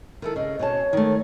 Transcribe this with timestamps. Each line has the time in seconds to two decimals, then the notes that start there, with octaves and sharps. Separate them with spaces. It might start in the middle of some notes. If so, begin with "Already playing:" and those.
0.22 D#3 E4 A4
0.36 C#3 D#5
0.59 B2 C#4 C#5 A5
0.93 D#3 A3